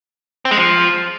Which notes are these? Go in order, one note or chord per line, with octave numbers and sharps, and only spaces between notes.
C4
G#3
F3